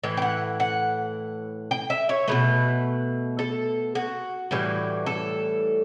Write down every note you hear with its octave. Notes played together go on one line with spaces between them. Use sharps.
A2 E3
G5
F#5
F#5
G5
E5
C#5
B2 F#3 A3 B4
A4
F#4
A2 E3 G3
A4